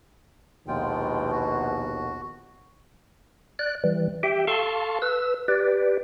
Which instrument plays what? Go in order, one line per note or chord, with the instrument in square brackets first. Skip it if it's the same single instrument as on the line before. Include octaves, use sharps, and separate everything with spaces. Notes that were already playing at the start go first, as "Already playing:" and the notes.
[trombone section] A#1 D#2 B2 [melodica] G#3 F4 G5
[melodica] F#4
[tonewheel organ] D5 F#6
E3 G3
G4 E5 G5
A4 F5 A5 C6 C#6
B4 E6
G4 B4 D5